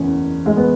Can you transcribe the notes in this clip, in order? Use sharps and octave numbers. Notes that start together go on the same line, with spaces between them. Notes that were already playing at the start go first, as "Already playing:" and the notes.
Already playing: F#1 E2 C#4
G#3
B3